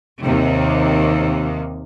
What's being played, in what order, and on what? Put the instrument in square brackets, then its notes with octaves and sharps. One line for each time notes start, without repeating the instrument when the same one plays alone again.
[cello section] D#2 C3 D#3